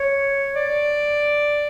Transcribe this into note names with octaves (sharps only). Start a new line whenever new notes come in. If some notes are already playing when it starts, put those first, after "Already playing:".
Already playing: C#5
D5